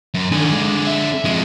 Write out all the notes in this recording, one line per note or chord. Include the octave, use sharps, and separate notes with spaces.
F#2
D3 D#3 D4 G#4
G#3
E5
F2 G#3